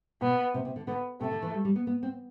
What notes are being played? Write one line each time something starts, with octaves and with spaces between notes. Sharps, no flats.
B2 B3
C3
C3
D3
D3 B3
C3 A3
D3
E3
G3
G3
B3
B3
C4